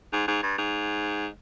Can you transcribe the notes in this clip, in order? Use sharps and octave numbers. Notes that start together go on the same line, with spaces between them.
G#2
G#2
G2
G#2